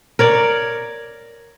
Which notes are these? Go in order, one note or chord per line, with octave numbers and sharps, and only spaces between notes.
A#4 C#5 D5